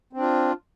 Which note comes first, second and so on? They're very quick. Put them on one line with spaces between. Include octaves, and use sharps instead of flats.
C4 D4 F4